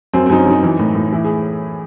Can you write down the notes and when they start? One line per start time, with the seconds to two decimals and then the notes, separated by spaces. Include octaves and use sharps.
0.13 F#2 C4
0.26 C4
0.30 F#2 D#4
0.38 C#4
0.46 F#2 D#4
0.63 E3
0.79 A2
0.95 A2
1.12 E3 E4
1.25 G#4